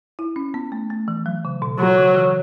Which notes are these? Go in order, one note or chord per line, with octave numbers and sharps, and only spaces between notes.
E4
C#4
B3
A3
A3
E3
F#3
C#3
B2
B2 F#3
C#3
E3